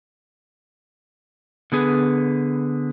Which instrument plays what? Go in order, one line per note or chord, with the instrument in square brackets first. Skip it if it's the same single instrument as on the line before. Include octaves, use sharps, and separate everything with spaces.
[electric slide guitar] D3 B3 G#4 B4